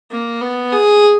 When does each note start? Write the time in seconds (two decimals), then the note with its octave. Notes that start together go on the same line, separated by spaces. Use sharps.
0.11 A#3
0.41 B3
0.72 G#4